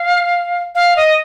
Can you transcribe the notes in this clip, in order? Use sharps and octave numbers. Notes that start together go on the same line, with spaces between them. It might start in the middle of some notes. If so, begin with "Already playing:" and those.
Already playing: F5
F5
D#5